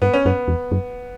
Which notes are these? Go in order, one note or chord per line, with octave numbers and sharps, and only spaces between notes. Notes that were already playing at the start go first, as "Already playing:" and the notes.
G2 B3
C#4
F#2 B3
E2
F#2